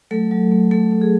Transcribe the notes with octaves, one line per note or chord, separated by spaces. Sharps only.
F#3 A3 A4
F#3
A3
A3 A4
A3
G#4